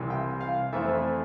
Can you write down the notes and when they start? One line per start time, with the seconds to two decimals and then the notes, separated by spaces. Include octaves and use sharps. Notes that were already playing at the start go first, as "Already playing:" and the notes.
Already playing: C2 C3 E3 G3
0.10 G5
0.41 F5
0.73 F2 E3 A3 C4 E5